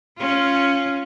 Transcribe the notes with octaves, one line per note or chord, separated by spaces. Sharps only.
C#4 F4